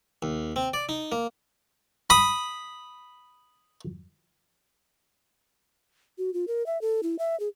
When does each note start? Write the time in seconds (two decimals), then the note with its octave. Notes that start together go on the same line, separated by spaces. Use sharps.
0.22 D#2
0.56 C4
0.74 D5
0.89 D#4
1.12 A#3
2.10 B5 D#6
6.18 F#4
6.34 F4
6.48 A#4
6.66 E5
6.81 A4
7.03 E4
7.19 E5
7.40 G#4